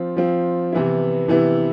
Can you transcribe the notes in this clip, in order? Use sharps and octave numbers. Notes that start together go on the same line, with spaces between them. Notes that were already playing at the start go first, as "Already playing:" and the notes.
Already playing: F3 C4 F4
F3 C4 F4
C3 E3 B3 E4
C3 E3 B3 E4